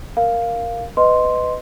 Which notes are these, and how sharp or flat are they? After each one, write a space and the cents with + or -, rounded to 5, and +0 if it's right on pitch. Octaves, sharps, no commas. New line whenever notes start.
A#4 +0 F5 +0
B4 +25 D#5 +0 C6 +0